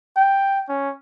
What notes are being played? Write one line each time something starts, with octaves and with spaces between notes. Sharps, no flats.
G5
C#4